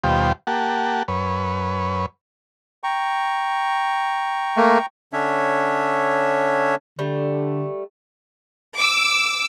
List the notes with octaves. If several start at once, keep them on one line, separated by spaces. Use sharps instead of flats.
D#2 B2 G3 F4 C5 G5
A#3 G4 F#5 A5
F#2 B4 C#5
G5 A#5 C#6
A3 A#3
D3 C#4 D4 C#5 E5
D3 G3 A3
D6 E6